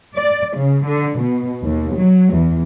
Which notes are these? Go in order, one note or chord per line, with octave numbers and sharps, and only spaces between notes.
D5
C#3
D3
B2
D#2
F#3
E2